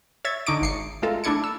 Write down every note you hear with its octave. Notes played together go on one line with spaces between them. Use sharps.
C#5 E5 G#6 A6
D3 D#4 C#6 D6 D7
G#1 C7 C#7
G#3 A3 F4 A4 A#4
A3 D4 E4 D5 G#6 C#7
E6